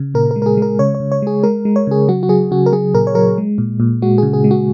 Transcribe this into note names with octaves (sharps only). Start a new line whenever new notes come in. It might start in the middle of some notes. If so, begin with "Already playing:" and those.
Already playing: C#3
A#2 A#4
A#4
G#3
A#4
G#4
G#3 A#4
C#3 C#5
C#5
C#3
C#5
G#3 G#4
G#3 A#4
G#3
C#5
C#3 G#4
F#3 F#4
F#4
F#3 G#4
C#3 F#4
A#4
F#3 G#4
A#2 A#4
C#5
F#3 A#4
G#3
A#2
A#2
G#3 F#4
C#3 G#4
G#4
G#3
F#4